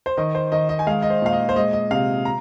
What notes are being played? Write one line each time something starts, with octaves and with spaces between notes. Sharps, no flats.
C5
D#3 D#5
C5
D#3 D#5
D#5
G#5
G#3 F5
D#5
C5
A#2 F5
D#5
C5
G#3 D#5
D#5
C3 F5
A#5